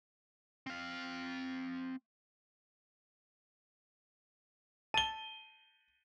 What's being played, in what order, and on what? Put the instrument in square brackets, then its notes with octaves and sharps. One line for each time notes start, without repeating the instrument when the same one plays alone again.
[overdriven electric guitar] C4 F5
[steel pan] A5 [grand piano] D#7 G7